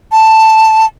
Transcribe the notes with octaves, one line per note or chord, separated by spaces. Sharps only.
A5